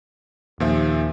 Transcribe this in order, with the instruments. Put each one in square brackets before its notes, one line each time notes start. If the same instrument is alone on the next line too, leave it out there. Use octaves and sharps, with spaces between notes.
[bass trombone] D#2 [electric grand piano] A#2 F3 E5